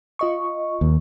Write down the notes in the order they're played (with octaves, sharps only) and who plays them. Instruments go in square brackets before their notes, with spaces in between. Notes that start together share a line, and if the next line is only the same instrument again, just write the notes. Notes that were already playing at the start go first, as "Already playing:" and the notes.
[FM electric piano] F4 D#5 C#6
[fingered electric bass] D#2